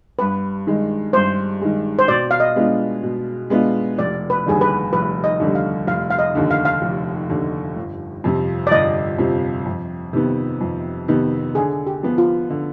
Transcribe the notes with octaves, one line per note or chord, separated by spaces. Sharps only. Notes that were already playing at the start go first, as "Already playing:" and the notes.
G2 B4
D#3 G#3
G2 C5
D#3 G#3
C5
B2 D5
F5
D#5
G#3 B3 D4 F4
B2
G#3 B3 D4 F4
F1 D5
B4
D#2 D3 G3 G#4
B4
F1 B4
D#5
D#2 D3 G3
F5
F1 F5
F5
D#5
D#2 D3
F5
F5
F1
D#2 D3
G1
F2 C3 F3
D5
G1 D#5
F2 C3 F3
F2
C3 D#3 B3
F2
C3 D#3 B3
D3 G#4
G4
F3 B3
F4
D3